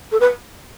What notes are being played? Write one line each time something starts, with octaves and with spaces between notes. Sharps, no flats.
A4
B4